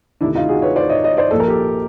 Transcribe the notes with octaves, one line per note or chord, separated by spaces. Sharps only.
D2 C3 D#3 D4 E4
D#4 F4
F#4 G#4
B4 C#5
C5 D5
C#5 D#5
C#5 D#5
C5 D5
A#1 A#2 F3 A4
A#4
G4 A4